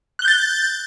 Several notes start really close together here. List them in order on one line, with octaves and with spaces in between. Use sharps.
F#6 G7 G6 A6